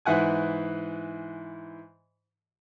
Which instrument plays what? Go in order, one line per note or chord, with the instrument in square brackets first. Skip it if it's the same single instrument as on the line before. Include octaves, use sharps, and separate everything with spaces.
[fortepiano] G#2 E3 E4 F#5 G#5